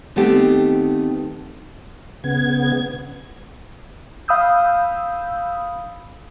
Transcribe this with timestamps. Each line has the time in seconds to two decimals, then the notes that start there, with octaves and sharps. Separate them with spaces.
0.16 D#3 A3 B3 C4 G4
2.24 C#3 B3 G#6
4.28 F5 B5 D#6 E6 G6